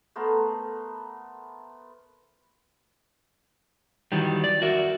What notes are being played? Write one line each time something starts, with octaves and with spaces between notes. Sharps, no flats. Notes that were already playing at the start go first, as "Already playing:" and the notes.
A3 B3 A#4 C5
D#3 E3 F#3 G3
D5
F#4 A#4 E5